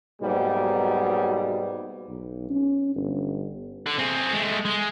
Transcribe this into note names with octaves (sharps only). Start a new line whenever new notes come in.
G#2 B2 F#3 G3 A#3 B3
B1
C#4
G1
D3
C4 G#4
G#3 A3
G#3